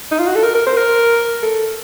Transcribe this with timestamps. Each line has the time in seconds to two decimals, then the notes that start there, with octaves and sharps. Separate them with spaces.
0.12 D#4
0.19 F4
0.27 F#4
0.36 A4
0.43 A#4
0.55 A#4
0.66 C5
0.77 A#4
1.43 A4